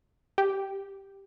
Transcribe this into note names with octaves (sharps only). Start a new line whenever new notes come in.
G4